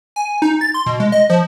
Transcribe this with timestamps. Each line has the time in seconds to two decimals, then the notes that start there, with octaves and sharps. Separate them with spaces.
0.16 G#5
0.42 D#4
0.61 A6
0.74 C6
0.86 B2
1.00 G#3
1.12 D#5
1.30 F3